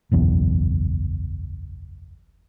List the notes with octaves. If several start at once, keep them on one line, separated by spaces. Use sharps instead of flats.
F#1 B1 E2